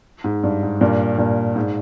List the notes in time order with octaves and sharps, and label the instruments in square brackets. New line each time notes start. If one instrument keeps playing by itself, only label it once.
[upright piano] G#2
G2
G#2
G2 A#2
G2 A#2
G#2